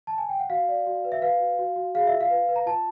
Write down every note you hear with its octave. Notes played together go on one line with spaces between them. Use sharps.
A5
G#5
G5
F#5
F#4 F5
D5
F#4
B4
E5
B4 F5
F#4
F#4
F#4
G#4 F5
E5
F4
F5
B4
B4
A#5
F4 A5